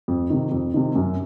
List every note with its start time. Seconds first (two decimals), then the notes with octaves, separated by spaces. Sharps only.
0.08 F2
0.30 C3 D#3
0.52 F2
0.74 C3 D#3
0.95 F#2